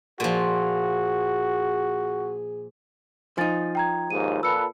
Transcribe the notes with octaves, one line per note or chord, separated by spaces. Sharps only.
A#2 F3 F#4 G#4
F3 D#4 G#5 A6
G5 A#5 G#6
D#2 G#2 D#7
A#2 A4 B4 E6 C#7